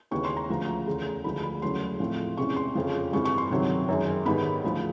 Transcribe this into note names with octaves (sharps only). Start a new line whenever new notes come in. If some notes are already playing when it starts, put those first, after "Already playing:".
D#2 C#3 E3 G#3 B3 C#6
C6
A#5
D2 C#3 F3
E2 C#3 E3 A3
D2 D3 F3 G#3 B5
B5
E2 C#3 F#3 A3 C#4 C6
A2 F3 A3 C4
E2 C3 E3 G#3 C#4 C#6
C6
F2 C#3 F3
G2 E3 G#3 C4 C#6
C#6
C6
C#2 C3 D#3 F#3
F#2 D#3 G#3
G#2 D#3 G3 B3 B5
D2 C#3 F3